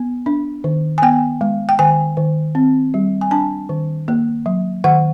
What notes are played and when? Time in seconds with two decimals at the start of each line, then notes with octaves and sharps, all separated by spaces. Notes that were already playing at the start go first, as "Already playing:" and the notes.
Already playing: B3
0.26 D4
0.64 D#3
0.98 G#5
1.02 B3 G5
1.41 G#3
1.69 G5
1.79 D#3 G#5
2.17 D#3
2.55 C4
2.94 G3
3.21 G#5
3.31 D4 A5
3.69 D#3
4.08 A#3
4.46 F#3
4.84 D#3 F#5